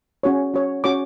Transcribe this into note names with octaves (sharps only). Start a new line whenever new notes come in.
C#4 F#4 C#5
C#4 F#4 C#5
C#4 F#4 C#5 D6